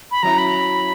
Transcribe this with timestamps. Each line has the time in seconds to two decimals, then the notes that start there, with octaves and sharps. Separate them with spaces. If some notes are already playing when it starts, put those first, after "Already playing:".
0.11 B5
0.23 F#3 C#4 E4 A#5
0.38 B5